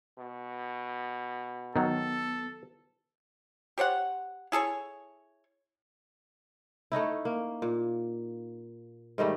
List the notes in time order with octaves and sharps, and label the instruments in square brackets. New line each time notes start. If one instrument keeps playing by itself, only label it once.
[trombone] B2
[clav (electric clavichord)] D#3 F#3 [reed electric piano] B3 [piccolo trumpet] A4
[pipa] G4 C5 C#5 F#5
E4 G#4 A4 C#5
[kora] A3 C#4 D#4 E4
A#3
A#2
G#2 D#3 G3 A3